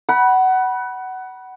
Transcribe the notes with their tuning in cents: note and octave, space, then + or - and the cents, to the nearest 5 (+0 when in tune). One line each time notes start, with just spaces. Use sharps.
F#5 +20 B5 -20